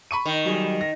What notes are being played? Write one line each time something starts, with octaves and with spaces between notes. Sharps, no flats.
B5 C#6 D#7
D#3
F#3 G3 G#4
A#6